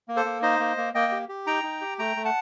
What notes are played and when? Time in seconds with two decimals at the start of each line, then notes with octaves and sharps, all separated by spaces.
0.08 A#3
0.16 A4 C5
0.25 A#3
0.42 D#4 C5 D#5
0.60 A#3
0.77 A#3
0.94 A#3 D#5 G5
1.12 G4
1.29 G4
1.47 D#4 G5 A#5
1.64 D#4
1.81 G4
1.98 A3 G5 A#5
2.17 A3
2.25 F#5 A5